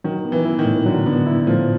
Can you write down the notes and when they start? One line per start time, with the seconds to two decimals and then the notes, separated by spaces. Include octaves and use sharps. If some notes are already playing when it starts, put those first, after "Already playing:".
0.04 D#3 F#3
0.25 B3
0.32 E3
0.45 E4
0.59 D#3
0.65 A2
0.86 D3 F#3
1.06 D3 B3
1.27 E4
1.47 A2 F3